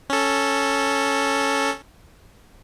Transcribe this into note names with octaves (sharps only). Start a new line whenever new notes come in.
C#4 A4